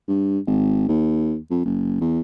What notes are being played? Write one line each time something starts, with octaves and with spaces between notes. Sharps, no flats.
G2
G#1
D#2
F2
F#1
E2